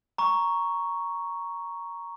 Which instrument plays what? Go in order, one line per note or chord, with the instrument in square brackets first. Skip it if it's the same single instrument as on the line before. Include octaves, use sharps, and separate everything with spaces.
[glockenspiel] A#5 C#6